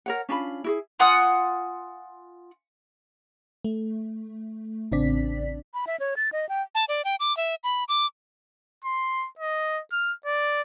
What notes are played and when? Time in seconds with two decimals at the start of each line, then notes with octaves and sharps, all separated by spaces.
0.06 A#4 C#5 F#5
0.29 C#4 D4 F4 B5
0.64 E4 F#4 G#4
1.00 F4 F#5 G#5 D#6
3.64 A3
4.92 A1 C#3 C4 D4 D5 B6
5.74 B5
5.87 E5
6.00 C#5
6.17 A6
6.32 D#5
6.49 G5
6.75 A5
6.88 D5
7.05 G5
7.20 D6
7.37 E5
7.64 B5
7.88 D6
8.84 C6
9.39 D#5
9.92 F6
10.26 D5